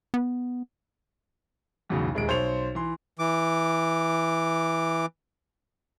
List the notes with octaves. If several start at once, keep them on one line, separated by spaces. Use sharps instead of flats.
B3
B1 E2 A2 C#3 F#3
D#1 G#3 D7
B1 C5 C#5 C6 F7
E3 C6
E3 D6